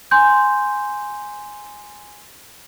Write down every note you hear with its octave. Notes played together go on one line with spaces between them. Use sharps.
G#5 C6 G6